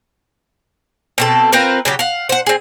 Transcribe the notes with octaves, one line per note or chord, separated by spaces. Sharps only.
B2 C4 A4
C4 F4 A#4 B4
C#3 F#3 G4
F5 F#5
C5 F#5
C4 G#4